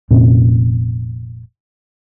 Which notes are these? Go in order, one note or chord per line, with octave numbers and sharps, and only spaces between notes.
F1 A#2 C4 C#4